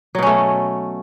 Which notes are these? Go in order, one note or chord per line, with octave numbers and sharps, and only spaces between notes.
B2 F#3 A3 C#4